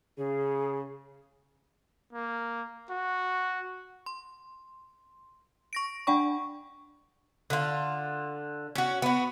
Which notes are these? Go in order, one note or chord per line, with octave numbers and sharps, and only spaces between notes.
C#3 G#4
A#3
F#4
C6
C#6 A#6 D7
D4 D5 F#5 G5 B5 C#6
D3 F4
C#4 F#4
B3 F#4